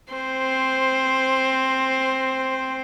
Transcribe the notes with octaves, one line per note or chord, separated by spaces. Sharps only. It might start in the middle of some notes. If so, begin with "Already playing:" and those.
C4 C5